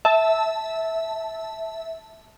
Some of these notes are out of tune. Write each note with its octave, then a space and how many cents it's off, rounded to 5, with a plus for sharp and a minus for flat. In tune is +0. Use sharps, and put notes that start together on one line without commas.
E5 -15 A5 +0